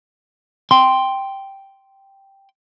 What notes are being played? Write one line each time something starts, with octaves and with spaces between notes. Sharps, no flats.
G5 C6